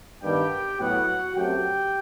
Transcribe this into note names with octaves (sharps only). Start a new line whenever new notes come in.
G2 D#3 G3 B3 G4 G5
A2 F#3 B3 F#4 F#5
F#2 F#3 A3 C4 G4 G5